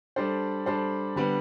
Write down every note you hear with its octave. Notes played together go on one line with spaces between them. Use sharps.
G3 D4 A4 C5
G3 D4 A4 C5
D3 G3 B3